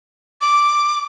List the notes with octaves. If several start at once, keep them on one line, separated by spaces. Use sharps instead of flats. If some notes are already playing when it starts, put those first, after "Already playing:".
D6